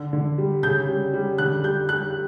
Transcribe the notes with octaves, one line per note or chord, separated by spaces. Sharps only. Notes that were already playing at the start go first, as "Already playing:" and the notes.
Already playing: D3
D3
G3
C#3 G6
G3
G3
D3 F#6
G3 G6
G3 F#6